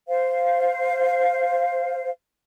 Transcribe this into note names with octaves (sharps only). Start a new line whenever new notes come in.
C5 F5